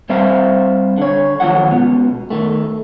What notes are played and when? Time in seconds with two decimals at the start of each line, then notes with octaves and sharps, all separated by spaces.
0.09 G3 C4 C5 E5 F5
0.98 D3 C#5
1.40 D#2 C3 F3 F#3 F#5
1.71 C#2 B2
2.30 D#3 A3